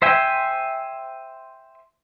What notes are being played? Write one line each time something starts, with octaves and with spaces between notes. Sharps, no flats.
C5 E5 G5 G#5